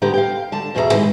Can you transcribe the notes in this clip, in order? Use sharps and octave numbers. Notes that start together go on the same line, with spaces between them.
D2 D3 B3 G4 A4 A#5
F5 G5
D3 A5
E2 B2 G#4 A4 E5 A#5
D#3 E3 G#3